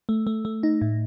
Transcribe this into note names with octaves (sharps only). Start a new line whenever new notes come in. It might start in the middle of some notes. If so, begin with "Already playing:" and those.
A3
A3
A3
D#4
A2